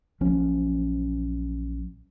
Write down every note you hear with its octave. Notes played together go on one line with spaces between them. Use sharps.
A#1 F3 F#3 C#4